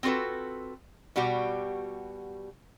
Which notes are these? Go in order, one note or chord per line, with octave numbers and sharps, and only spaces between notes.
C4 F4 F#4 A4 B4
B2 G3 F#4 G4